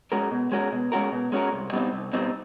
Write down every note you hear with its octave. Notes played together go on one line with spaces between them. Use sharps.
G#3 C#4 F#4 A#4
B2
G#3 C#4 F#4 A#4
B2
G#3 C#4 F#4 A#4
B2
G#3 C#4 F#4 A#4
C2
B2 G3 C4 D#4
C2
B2 G3 C4 D#4